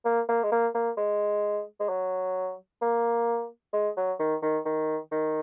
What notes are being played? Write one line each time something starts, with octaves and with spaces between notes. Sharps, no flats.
A#3
A#3
G#3
A#3
A#3
G#3
G#3
F#3
A#3
G#3
F#3
D#3
D#3
D#3
D#3